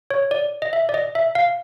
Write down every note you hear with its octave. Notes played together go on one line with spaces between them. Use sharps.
C#5
D5
D#5
E5
D5
D#5
E5
F5